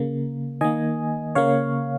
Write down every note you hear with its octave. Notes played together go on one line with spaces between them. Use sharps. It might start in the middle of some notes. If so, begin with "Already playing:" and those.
Already playing: C#3 A#3
D#3 A#3 D#5 G#5
C#3 A#3 C#5 F5